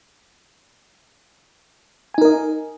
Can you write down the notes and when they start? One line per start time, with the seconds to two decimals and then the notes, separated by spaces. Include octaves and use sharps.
2.14 G#5
2.18 D#4
2.21 A#4
2.25 D#5